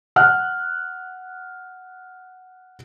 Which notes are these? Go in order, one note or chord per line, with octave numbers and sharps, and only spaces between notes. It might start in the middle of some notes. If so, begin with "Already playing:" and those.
F#5 F6 F#6